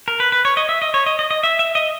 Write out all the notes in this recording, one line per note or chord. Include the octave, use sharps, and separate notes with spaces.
A#4
B4
B4
C#5
D#5
E5
D#5
C#5
D#5
D#5
D#5
E5
E5
D#5